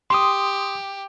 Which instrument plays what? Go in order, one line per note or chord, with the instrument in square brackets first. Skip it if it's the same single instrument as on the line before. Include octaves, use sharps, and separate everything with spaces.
[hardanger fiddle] G4 [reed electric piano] C6 D#6